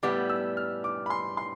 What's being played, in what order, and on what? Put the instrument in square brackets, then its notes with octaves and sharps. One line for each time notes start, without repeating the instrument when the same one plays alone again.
[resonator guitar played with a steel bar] A2 G3 B3 [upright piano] D6
[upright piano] E6
F6
D6
B5
C6
C6